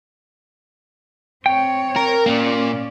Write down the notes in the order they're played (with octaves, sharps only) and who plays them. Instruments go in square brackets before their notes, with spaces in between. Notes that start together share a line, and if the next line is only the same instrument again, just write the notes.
[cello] C4 C#5 [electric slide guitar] G5
[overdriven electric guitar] A#4
[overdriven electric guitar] A#2 A#3 [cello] C#4 D5